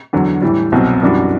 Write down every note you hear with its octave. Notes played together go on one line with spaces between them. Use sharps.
E2 D3 F#3
A2 E3 G3
C2 B2 F#3 C4
F#2 E3 G3 D4 F#4